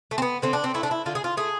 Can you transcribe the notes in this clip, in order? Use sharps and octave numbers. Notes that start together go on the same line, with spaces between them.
A3
C4
B3
D3 C4
D4
C4
A3 E4
D4
E4
D3 F4
G#4
F4
A3 G#4